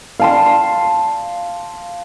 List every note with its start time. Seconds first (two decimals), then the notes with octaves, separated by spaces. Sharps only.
0.20 F5 A5 C6